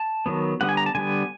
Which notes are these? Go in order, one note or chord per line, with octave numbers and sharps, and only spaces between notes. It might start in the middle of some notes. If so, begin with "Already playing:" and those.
Already playing: A5
D#3 F#3 B3
D3 G3 B3 F#5
G#5
A#5
A5
D3 G3 B3 G#5